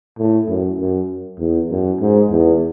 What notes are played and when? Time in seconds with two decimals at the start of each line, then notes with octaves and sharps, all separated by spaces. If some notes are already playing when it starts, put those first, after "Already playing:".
0.18 A2
0.48 F#2
0.79 F#2
1.39 E2
1.70 F#2
2.00 G#2
2.30 E2